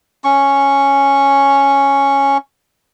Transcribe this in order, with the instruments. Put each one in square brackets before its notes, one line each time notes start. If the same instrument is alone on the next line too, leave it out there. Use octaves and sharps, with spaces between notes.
[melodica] C#4 C#6